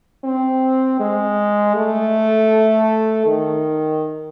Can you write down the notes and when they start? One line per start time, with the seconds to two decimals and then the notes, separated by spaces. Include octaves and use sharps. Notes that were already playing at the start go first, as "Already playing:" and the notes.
0.24 C4
1.00 G#3
1.76 A3
3.26 D#3